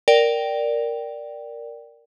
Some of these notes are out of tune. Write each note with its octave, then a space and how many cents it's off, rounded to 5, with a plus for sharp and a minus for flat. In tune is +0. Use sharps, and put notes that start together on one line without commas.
A#4 +0 D5 +0 G5 -10